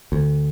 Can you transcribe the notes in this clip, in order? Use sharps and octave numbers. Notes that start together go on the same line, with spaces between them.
D2